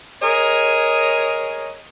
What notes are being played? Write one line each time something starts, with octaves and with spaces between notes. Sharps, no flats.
G#4 A#4 C#5 D#5